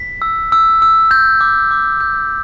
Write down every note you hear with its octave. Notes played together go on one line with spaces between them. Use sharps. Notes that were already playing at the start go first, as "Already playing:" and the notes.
Already playing: B6
E6
E6
E6
G6
D6
D6
G6